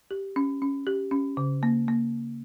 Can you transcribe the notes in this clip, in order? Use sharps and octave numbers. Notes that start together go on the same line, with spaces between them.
G4
C#4
C#4
G4
C#4
C#3
A#3
A#3